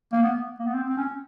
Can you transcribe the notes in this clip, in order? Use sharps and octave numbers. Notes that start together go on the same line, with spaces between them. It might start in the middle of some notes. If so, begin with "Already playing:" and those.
A#3
B3
A#3
B3
C4
C4
C#4